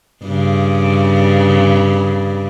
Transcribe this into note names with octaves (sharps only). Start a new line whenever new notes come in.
G2 C#3